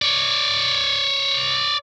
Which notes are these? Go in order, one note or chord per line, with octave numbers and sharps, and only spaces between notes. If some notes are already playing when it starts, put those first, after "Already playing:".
C#5 D5